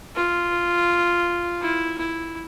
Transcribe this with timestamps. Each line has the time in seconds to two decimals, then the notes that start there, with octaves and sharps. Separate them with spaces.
0.16 F4
1.61 E4
1.98 E4